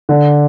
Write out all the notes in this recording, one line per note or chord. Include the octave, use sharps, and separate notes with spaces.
D3